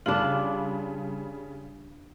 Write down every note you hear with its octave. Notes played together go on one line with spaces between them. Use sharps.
C#3 G3 D4 F4 F#7